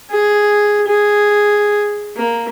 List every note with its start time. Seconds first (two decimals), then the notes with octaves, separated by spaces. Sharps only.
0.11 G#4
0.88 G#4
2.16 A#3